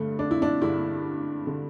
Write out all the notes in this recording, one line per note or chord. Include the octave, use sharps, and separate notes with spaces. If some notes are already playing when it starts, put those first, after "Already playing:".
Already playing: G2 D3 A3
D4
E4
D4
G2 D3 E4
D3